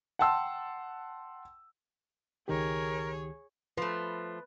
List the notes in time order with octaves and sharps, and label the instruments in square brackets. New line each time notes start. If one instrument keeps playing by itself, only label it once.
[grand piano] F#5 G5 A5 C6 E6
[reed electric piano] C#2 D#3 G4 [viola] G#4 C#5 [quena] A#4
[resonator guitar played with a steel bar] F3 A3 [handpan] B4